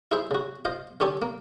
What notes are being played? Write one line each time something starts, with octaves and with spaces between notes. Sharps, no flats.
E4 G#4 C5 E5
C#3 F#4
F4 C5 D#5
D3 C4 C#4 G4 A4 C#5
A#3